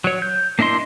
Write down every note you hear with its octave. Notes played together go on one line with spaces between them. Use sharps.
F#3 C#5
G6
A#3 D4 E4 D#5 C6